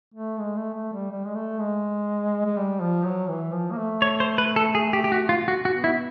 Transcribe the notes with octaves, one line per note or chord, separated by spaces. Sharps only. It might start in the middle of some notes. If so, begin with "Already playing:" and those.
A3
G#3
A3
A3
G3
G3
G#3
A3
G#3
G#3
G3
F3
F#3
E3
F3
A#3
A3
C#5
C5
B4
A4
G#4
G4
G4
F#4
F4
F#4
F#4
B3
E4